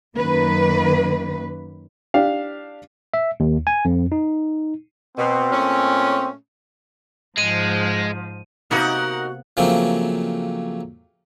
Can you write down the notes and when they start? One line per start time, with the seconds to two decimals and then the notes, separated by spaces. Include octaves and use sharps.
0.16 F#2 D#3 A#3 B4
2.14 D4 G4 F5
3.14 E5
3.40 D#2
3.67 G#5
3.85 F2
4.12 D#4
5.17 B2 C4
5.52 A#2 A3 C#4
7.38 G#2 F3 G#3 D#7
8.71 C3 A#3 B3 D#4 F#4 A#4 F#5
9.57 C#3 F3 F#3 A3 A#3 C4